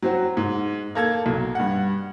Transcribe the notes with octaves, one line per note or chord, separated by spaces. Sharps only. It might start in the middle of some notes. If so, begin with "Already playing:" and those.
F#3 C4 F#4
G#2
A#3 A4 G#6
B1
G2 F#5